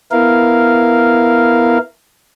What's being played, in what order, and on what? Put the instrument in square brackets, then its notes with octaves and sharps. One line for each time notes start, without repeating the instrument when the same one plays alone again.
[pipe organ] B3 E4 A#4 F5